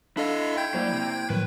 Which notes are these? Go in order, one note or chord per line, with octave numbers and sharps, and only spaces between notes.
D4 E4 A4 D#5 F5
G5 G6 G#6
F#3 A#3 E4 C5 D5
C3
A2 D#3 F3 F#3 B4